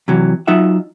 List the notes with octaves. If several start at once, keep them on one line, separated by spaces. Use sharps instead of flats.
C3 E3 F#3
F#3 D#4 F4 E5 F#5